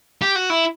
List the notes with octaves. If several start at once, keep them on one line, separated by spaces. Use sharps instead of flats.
G4
F#4
E4